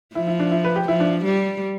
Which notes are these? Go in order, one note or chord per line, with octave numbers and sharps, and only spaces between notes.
F3 E4
E4
D4
E4
B4
G4
F3 E4
D4
G3